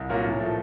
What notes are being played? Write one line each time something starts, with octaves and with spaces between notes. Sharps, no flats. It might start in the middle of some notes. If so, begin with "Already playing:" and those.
Already playing: C2
A#2 F#3 A#3
A2
F3 A3